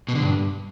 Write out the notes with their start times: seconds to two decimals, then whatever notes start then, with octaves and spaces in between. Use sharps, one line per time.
0.08 B2
0.15 D3
0.22 G2